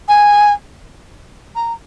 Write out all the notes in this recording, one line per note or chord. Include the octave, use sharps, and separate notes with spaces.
G#5
A#5